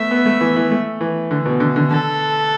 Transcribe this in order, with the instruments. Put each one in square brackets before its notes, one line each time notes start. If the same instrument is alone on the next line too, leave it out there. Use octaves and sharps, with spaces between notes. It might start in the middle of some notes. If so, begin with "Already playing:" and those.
Already playing: [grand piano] A3 B3 [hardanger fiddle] E5
[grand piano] B3
A3
E3
E3
A3
E3
D3
B2
D3
D3
[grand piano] D3 [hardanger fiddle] A4